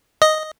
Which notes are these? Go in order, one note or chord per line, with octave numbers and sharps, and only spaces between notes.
D#5